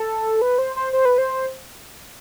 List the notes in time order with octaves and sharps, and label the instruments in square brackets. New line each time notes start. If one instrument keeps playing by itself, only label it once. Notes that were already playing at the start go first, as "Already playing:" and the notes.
Already playing: [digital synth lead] A4
B4
C5
C5
C5
B4
C5